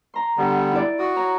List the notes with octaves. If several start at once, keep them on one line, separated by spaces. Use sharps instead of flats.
A#5 C6
D3 G3 B3
E4 D5
F#4 D#6
C#5 A#5